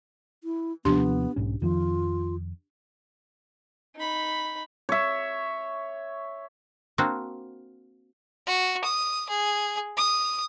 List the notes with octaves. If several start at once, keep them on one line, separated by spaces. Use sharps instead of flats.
E4
D#2 C3 F3 B3 D4 G4 C6
B1 G#2 C#4
F2 D#3 F3 F4
D#4 B5
C#5 E5
A#3 C4 D4 F#4
F#4
D#6
G#4
D#6